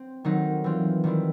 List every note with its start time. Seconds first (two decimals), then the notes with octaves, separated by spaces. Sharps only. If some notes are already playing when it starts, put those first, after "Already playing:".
Already playing: C4
0.25 D#3 F#3 A3 C4 D#4
0.64 E3 G3 C4 F4
1.04 D#3 G3 C4 E4